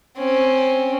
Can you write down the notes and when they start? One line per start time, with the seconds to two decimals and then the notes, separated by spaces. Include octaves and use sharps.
0.18 C4 C#4